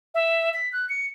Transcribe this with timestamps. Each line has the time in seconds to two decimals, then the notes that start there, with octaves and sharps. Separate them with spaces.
0.15 E5
0.54 B6
0.73 F#6
0.89 C#7